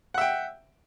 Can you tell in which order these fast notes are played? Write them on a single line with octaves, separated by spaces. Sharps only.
F#5 E5 G5